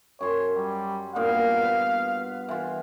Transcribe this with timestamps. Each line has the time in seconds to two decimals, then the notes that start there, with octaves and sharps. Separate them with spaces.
0.21 F#2 C#5 C6
0.56 G3
1.16 G2 A#2 B3 F5
1.62 B4
2.49 E3 F4